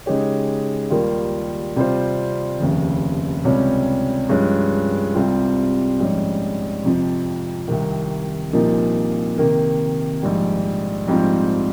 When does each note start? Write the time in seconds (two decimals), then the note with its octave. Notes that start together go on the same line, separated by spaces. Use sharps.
0.06 C#3 G#3 D#4 G4 C#5
0.90 D#2 D#3 G3 A#3 F4
1.76 C3 G3 C4 F4 C5
2.60 F1 D#2 C#3
3.44 C#2 C3 G3 C#4
4.29 G2 F3 G#3 C#4
5.14 C2 C3 G3 C4 F4
6.00 A#1 G#2 G3 C#4
6.84 F2 C3 F3 C4
7.68 C2 C3 D#3
8.53 C2 A#2 F3 A#3 D#4
9.38 C3 D#3 A#3
10.23 A#1 G#2 G3
11.07 A#1 G#2 G3 C4 F4